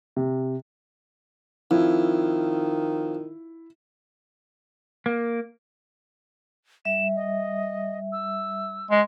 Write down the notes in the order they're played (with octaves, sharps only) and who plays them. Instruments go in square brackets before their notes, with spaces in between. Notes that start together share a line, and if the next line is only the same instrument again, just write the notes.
[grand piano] C3
[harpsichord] F2 [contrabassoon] D#3 [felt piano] E4
[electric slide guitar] A#3
[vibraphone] G3 E5 [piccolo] E7
[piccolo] D#5
E6
[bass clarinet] G#3